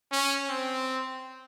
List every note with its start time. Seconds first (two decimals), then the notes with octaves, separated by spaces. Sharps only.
0.12 C#4
0.49 C4